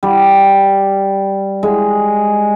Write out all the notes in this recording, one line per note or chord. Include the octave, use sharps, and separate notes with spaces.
G3
G#3